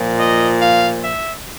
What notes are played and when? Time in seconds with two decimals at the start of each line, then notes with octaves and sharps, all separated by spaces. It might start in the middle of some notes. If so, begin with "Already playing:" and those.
Already playing: A#2 F3
0.20 D#5
0.62 F5
1.04 E5